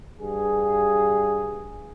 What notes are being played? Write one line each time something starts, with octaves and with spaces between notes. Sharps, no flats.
G2 G#4